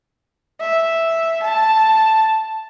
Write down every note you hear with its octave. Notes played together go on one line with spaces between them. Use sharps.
E5
A5